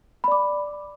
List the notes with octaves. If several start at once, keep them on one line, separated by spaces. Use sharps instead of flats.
D5 B5 D6